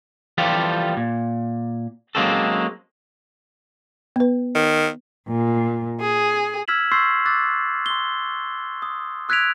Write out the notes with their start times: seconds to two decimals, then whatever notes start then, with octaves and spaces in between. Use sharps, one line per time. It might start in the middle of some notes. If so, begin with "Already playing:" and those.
0.38 E3 F3 G3 F4 G4 A4
0.97 A#2
2.15 F#3 G#3 A#3 C4 C#4 A4
4.16 B3 B4
4.55 D#3
5.28 A#2
6.01 G#4
6.68 E6 F6 G#6 B6 E7 F#7
6.91 C6 C#6 E6 G6 A6 C7
7.26 D6 E6 F#6 A6
7.86 C6 G7
8.82 D#6
9.29 E6 F#6 G#6 B6 D7 F7